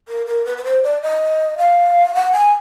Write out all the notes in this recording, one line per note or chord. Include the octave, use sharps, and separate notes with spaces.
A#4
A#4
B4
B4
C5
D5
D#5
F5
F#5
G#5